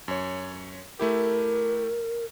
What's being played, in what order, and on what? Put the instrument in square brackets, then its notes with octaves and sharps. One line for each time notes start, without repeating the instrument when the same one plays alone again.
[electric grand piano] F#2 C#5
[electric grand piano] A3 E4 G4 [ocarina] A#4